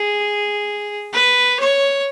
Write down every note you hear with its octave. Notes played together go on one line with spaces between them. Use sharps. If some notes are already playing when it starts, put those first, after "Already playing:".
Already playing: G#4
B4
C#5